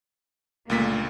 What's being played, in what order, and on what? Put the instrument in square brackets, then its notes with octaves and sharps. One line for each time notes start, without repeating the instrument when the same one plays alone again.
[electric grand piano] C#2 A#2 B6 [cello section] D3 G3 A#3 [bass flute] A3